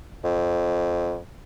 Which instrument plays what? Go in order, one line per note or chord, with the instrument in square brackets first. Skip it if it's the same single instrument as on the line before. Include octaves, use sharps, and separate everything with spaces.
[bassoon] F2